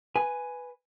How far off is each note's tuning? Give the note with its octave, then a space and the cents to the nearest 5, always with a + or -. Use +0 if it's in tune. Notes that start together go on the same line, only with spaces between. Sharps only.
B4 +5 G#5 +0